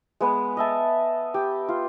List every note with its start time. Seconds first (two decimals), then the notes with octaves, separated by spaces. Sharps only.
0.21 G#3 B3 B4
0.57 D#5 E5 A5
1.34 G4
1.69 F4